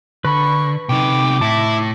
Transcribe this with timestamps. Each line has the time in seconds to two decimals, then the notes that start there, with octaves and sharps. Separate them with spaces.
0.25 D3 B4 B5 C#6
0.89 C3 D#4 G5 D6
1.41 A2 E4 A5